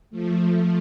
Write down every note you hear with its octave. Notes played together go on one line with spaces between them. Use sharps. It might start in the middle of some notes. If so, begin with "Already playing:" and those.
F3 A3